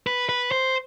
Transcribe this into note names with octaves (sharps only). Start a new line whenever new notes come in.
B4
B4
C5